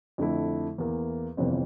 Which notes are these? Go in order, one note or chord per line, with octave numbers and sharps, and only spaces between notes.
F2 D3 A3 E4
E2 E3 A#3
G1 F2 C3 E3